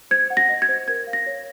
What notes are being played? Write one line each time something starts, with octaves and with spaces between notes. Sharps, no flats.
C5 G#6
F#5
A#6
D#5
G#6
C5
A#4 G#6
F5
A#6
C#5